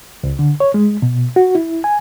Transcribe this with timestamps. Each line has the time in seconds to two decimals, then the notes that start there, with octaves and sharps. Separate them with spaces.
0.23 C#2
0.39 D3
0.60 C#5
0.74 G#3
1.02 B2
1.36 F#4
1.55 E4
1.84 G#5